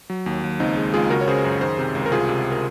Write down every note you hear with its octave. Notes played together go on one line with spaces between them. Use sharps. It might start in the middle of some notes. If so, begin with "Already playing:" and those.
F#3
D#2
D#2
C#2 C4 D#4
G#3
C#2 F4 G#4
C#3 F#4 A#4
C#5
C#3 G#4 C5
F#2
D#3 G#4 C5
C3
C#2
A#4
C2 F4 G#4
C3
A#4